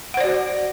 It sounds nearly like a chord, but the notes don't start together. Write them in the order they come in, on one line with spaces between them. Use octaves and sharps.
F#5 C5 D5 F#4